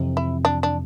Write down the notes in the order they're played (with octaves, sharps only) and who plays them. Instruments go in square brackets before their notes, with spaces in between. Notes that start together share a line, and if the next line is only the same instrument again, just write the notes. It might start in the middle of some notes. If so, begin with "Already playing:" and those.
Already playing: [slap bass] F2 C3 E3
[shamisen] E4
D4
D4